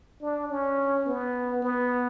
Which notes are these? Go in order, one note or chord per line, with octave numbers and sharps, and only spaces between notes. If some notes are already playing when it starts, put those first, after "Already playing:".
D4
C#4
B3
B3